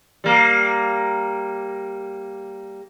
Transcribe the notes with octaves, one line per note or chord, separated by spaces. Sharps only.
G3 A#3